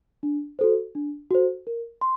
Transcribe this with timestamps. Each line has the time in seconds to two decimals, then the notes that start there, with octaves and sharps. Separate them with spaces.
0.23 D4
0.59 F#4 A4 C5
0.95 D4
1.31 F#4 A4 C5
1.67 A#4
2.01 C6